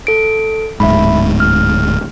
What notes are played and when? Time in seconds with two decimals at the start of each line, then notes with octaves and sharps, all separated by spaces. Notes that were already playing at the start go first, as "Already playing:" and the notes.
0.07 A4 D7
0.80 D1 G#2 E5 B5
1.40 F6